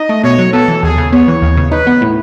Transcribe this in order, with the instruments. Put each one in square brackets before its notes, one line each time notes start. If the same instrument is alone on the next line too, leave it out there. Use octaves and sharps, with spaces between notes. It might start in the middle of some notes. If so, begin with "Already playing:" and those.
Already playing: [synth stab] D#4 [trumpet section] D#5
[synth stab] A3
[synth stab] B2 [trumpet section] C#5
[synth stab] F#3
[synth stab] B3 [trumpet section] A4
[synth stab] E3
[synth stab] D#2 [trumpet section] G#4
[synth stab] C#3
[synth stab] B3 [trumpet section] C#5
[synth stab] E3
D#2
C#3
[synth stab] D#4 [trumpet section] B4
[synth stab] B3
A2